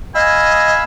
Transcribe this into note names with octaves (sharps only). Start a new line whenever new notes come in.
D#5 F5 G#5 B5 E6